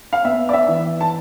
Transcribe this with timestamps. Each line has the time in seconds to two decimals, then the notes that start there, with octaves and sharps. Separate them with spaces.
0.13 F5
0.25 B3 E5
0.49 D5
0.53 E5
0.68 E3
1.01 A5